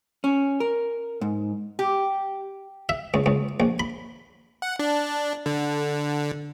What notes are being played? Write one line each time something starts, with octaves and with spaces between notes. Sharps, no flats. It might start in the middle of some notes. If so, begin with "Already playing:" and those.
C#4
A#4
G#2
G4
E5
C#2
C#2
A#1
B5
F#5
D4
D3